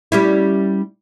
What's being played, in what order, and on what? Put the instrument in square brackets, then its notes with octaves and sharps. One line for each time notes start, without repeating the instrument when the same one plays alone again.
[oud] G3 C#4 E4